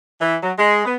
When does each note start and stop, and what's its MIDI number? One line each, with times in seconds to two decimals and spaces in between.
0.19 0.35 52
0.43 0.53 54
0.57 0.82 56
0.84 0.93 59